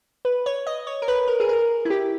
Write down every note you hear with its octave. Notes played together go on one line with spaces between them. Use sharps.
B4
C#5
D#5
C#5
A#4
B4
A#4
G#4
A#4
E4
G4